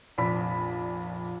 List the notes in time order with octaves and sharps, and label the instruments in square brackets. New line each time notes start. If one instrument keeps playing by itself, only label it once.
[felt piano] F1 A#1 D4 B5 B6